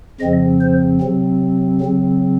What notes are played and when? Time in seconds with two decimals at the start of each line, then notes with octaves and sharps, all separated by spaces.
0.21 F2 C#3 F3 C4 D#5
0.61 C5
1.01 C3 F#3 C4
1.81 C#3 F#3 C4